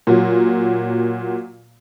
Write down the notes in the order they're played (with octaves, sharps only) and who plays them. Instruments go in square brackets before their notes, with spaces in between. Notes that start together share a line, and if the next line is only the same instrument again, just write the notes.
[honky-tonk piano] A#2 F#3